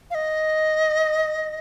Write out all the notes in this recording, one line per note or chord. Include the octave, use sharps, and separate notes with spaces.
F5
D#5